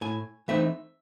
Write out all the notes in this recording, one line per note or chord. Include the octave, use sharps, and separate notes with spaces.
A2 G#5
E3 A3 C4 D#4 E5